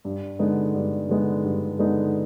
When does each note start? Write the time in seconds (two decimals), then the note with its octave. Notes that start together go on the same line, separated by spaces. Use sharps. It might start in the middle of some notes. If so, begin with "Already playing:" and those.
0.05 G2
0.39 D3 G#3 B3 D#4
0.74 G2
1.09 D3 G#3 B3 D#4
1.44 G2
1.79 D3 G#3 B3 D#4